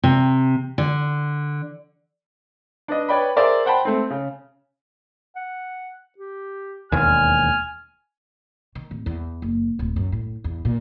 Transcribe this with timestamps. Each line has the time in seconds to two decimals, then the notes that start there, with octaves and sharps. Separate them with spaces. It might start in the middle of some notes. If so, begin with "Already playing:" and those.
0.03 C3
0.78 D3
2.88 D4 B4 D#5
3.09 B4 C#5 D5 G5 B5
3.36 G#4 A#4 C5 D5 E5
3.65 C5 F#5 G5 A5 B5
3.85 A3 C4
4.10 C#3
5.36 F#5
6.18 G4
6.92 E1 D#2 G#5 F6
8.75 D#3
8.91 D1
9.06 E2
9.42 F#1
9.79 D1
9.96 F#2
10.12 A2
10.44 E2
10.65 A#2